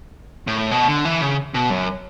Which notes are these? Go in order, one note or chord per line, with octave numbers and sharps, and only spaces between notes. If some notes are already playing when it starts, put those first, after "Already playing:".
A2
B2
D3
E3
C#3
B2
F#2